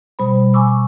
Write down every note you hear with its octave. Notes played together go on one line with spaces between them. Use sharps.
B2 G3 C5 B5
G#5 B5 C#6 D6 E6